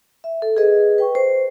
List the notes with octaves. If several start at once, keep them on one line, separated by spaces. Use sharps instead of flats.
E5
A4
G#4 B4 D#5
B4 G5 C#6
C5